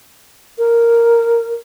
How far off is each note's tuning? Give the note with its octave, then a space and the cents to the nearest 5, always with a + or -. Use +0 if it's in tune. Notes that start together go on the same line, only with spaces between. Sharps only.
A#4 -5